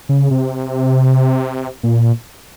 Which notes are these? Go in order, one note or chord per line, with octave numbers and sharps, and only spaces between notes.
C#3
C3
A#2